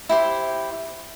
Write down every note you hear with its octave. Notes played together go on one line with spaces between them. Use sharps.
E4 G4 C5